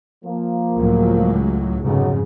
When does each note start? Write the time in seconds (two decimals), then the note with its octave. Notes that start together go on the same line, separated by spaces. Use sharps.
0.24 F3 A#3
0.76 C#2 A2 F#3
1.82 F1 B1 G#2 C#3 F#3